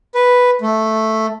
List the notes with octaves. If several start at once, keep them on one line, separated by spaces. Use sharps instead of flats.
B4
A3